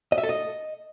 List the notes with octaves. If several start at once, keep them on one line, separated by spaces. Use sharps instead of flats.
D#5
E5
A4
D#5